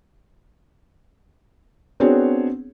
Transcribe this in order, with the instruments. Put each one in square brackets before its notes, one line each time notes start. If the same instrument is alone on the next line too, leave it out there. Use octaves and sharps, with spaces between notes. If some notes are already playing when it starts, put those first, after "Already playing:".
[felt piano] B3 C4 D4 F#4 G#4 C#5